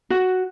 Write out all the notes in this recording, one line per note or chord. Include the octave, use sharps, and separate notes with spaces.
F#4